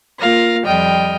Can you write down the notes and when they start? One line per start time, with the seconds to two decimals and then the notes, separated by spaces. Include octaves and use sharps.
0.20 A#3 F4 F5 A#6
0.65 F2 G3 D#5 G5 F6